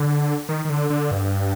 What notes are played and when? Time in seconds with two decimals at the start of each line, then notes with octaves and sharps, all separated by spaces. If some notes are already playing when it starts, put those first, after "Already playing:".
Already playing: D3
0.49 D#3
0.65 D#3
0.70 D3
0.90 D3
1.11 G2